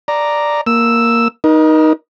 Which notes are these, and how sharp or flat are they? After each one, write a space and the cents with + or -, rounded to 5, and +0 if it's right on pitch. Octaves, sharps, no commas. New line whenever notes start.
D5 +0 A#5 +0
A#3 +0 E6 +0
D#4 +0 A#4 +40